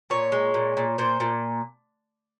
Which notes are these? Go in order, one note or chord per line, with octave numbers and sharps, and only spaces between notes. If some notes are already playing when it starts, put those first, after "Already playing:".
A#2 C#5
G#3
A#2
A#2
A#2 C5
A#2